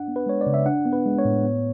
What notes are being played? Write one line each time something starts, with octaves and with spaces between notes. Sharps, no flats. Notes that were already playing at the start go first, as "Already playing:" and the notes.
Already playing: D4 F#5
B3
B4
G#3 C#5
D5
C#3
E5
D4 F#5
B3
B4
G#3
C#5
A2
B3